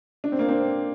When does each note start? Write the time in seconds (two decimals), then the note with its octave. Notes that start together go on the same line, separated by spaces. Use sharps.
0.24 D4
0.32 C4
0.39 A#3
0.48 C4